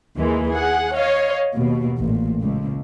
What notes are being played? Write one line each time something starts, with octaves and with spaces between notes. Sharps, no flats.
D#2 E3 G#3 A#3
G#4 F#5
C#5 D#5 F5
D#2 B2
A1 A#2
C#2